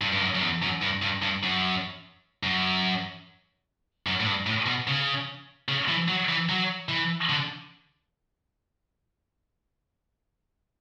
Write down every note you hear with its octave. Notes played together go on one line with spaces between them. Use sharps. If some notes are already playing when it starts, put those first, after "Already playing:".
G2
G2
F#2
F#2
E2
F#2
G2
G2
G2
F#2
F#2
F#2
A2
G2
A2
B2
C#3
C#3
E3
F#3
E3
F#3
E3
D3